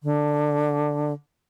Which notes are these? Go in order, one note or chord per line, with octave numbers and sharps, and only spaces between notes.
D3